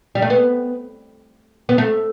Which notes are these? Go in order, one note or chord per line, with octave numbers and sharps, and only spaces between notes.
G3
A3
B3
B3
A3